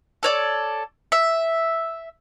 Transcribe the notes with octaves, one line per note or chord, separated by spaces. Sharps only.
A4 C#5 D5
E5